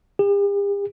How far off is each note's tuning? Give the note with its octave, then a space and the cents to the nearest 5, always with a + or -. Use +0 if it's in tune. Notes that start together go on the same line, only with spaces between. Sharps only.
G4 +45